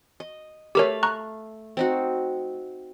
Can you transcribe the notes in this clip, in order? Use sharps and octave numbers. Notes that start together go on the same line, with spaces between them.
D#5
A3 G4 A#4 C#5 F5 B5
A#5 C#6 F#6
C4 D#4 F#4